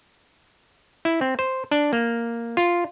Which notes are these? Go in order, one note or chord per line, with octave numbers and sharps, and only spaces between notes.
E4
C4
C5
D4
A#3
F4